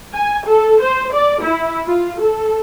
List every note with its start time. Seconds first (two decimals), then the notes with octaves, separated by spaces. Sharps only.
0.14 G#5
0.46 A4
0.82 C5
1.12 D5
1.41 E4
1.86 F4
2.20 A4